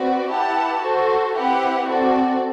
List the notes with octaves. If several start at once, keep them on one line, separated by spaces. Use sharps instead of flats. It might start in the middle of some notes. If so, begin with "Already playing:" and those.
Already playing: C4 F#4 B4 D5
E4 G4 B4 F#5 A5
F#4 A4 C5
C4 E4 G4 B4 F#5
C4 F#4 A4 D5